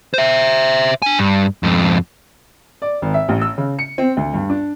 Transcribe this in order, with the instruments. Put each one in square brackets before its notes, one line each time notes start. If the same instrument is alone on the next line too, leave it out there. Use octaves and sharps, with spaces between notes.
[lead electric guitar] C5 E5
D4 G#5
G2
F2 G#2
[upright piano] D5
G#1
E5
A1
E6
C#3
C#7
C4
D2
G2
D4